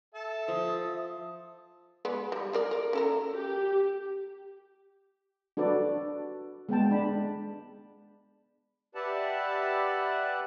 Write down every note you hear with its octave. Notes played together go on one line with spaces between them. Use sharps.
A4 E5
F3 D#6
G#3 B3 D5
G3
G#4 A#4 D5
A#4 D5
C#4 A4 A#4
G4
D4 F#4 A4 B4 D5
G#3 B3 G5 A5
D4 B5
G4 B4 D5 E5 F#5 A5